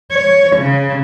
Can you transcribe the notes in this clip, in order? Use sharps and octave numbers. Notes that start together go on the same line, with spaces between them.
C#5
C#3